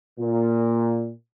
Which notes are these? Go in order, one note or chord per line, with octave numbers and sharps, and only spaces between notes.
A#2